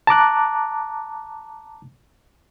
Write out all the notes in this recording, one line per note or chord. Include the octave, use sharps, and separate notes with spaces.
A5 A#5 D6 F#6